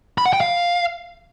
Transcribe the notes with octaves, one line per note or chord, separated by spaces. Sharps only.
B5
F#5
G5
F5